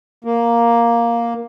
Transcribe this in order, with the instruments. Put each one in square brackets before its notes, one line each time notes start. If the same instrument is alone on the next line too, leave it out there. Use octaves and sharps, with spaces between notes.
[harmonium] A#3